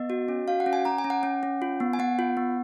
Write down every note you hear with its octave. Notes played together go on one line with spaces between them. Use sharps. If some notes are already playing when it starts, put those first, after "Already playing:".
Already playing: B3 D#5
F#4
C#4
F#4 F5
F#5
C#4
G#5
C#4 A#5
G#5
C#4
F#5
C#4 F#5
C#4
F4
B3
G#5
B3 F#5
F4
B3